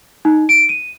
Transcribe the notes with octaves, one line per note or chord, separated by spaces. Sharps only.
D#4
D7
D#7